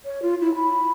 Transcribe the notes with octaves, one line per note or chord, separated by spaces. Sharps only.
C#5
F4
E4
B5